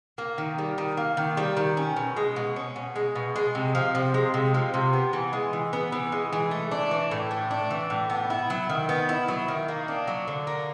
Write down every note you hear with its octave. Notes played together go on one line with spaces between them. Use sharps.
A#3
D#3
G3
D#3
A#3
D#3
G3
D#3
C#4
B2
G#3
B2
C#4
B2
G#3
B2
G#3
C3
F3
C3
G#3
C3
F3
C3
B3
E3
G#3
E3
B3
E3
G#3
E3
A3
D4
E3
A2
A3
D4
E3
A2
B3
E4
F#3
D#3
B3
E4
F#3
D#3
A#3
D4
F#3
D3
A#3